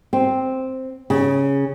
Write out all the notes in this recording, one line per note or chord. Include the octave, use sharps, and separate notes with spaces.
C4
C#3